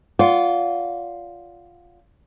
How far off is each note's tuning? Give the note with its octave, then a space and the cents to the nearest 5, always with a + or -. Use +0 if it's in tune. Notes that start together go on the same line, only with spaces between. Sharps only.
F4 +0 D5 -40 F#5 +0